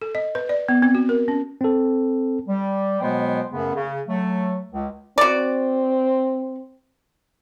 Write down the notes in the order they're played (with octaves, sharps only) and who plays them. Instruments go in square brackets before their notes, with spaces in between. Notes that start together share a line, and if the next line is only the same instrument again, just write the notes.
[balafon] A4
D#5
B4
D5
B3
C4
F#4
A#4
C#4
[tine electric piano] C4 A4
[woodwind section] G3
B2 F#3 G#3 B3 C5 G5
F#2 C#3 A3 B3
C#3
F#3 A3
C#2
[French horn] C4 [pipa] F#4 D5